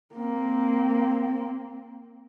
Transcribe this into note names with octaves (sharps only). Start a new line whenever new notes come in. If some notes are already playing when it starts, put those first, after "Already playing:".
A#3 C4